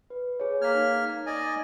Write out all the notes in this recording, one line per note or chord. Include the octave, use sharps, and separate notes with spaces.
B4
G#4 C#5
A#3 F6 G#6 B6
D#4
D5 D#5 G#5